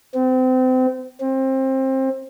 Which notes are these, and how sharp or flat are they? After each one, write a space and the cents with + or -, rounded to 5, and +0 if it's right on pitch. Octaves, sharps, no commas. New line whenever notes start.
C4 -30
C4 +25